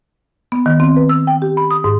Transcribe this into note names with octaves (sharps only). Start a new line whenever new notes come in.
B3
D#3
C4
B4
E6
G5
G4
B5
D#6
G#2